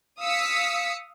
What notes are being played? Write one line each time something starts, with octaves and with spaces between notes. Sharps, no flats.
F5 D#6 E6 B6 C#7